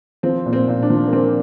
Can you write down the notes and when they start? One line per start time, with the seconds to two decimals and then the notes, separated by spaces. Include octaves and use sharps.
0.23 F3 C4
0.46 A#2
0.53 C4
0.68 A#2
0.83 D4
0.90 F3
1.07 A#3
1.13 F3 C4